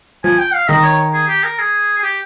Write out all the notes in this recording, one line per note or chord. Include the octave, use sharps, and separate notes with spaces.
F3 G#5
G5
F5
D#3 D#5
C#5
G#4
G4
A#4
G#4
G#4
G4